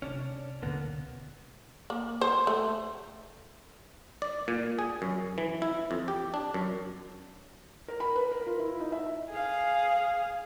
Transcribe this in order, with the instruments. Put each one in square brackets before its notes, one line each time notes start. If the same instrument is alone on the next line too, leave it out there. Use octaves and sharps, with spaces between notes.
[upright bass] C3 [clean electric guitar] C#4 D4
[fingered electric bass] D1 D2 B2 [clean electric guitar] D3 A#3 B3
[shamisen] A#3
C5
A3
[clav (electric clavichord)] D5
A#2
G#4
F#2
E3
E4
F2
G4
D4
F#2
[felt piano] A#4
B5
B4
A#4
F4
E4
D#4
E5
[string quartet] G#4 F5